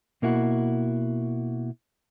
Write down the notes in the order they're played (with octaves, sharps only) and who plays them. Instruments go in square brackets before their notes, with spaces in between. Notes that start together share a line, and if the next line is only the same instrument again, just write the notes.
[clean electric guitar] B2 A#3 E4 F#4